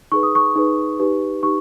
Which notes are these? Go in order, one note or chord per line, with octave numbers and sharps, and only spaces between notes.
D#4 G#4 B4 C#6
D#6
C#6
D#4 G#4 B4
D#4 G4 B4
D#4 G4 C#6